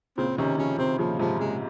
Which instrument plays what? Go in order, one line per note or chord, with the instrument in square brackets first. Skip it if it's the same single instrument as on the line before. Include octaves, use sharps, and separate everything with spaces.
[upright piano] A#2 C#3 [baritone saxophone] C4
[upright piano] C3 D#3 [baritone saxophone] C#4
[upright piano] C#3 F3 [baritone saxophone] C#4
[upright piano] C3 D#3 [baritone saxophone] C4
[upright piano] A#2 C#3 [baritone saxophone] F3
[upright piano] G#2 C3 [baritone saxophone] F3
[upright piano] A#2 C#3 [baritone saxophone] G#3